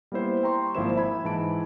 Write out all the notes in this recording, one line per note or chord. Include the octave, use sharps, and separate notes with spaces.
G3 A#3 B3 E4 C5
G5 A#5 C6 C#6
G#1 F3 A#3 E4 C5 E7
E5 B5 G#6
G#2 E3 A5 B5 D7